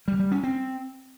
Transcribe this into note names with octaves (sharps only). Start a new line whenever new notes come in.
G3
G3
C#4
C4